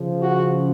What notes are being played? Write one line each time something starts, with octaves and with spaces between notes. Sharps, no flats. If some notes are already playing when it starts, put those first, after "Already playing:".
Already playing: C#3 F3
F#4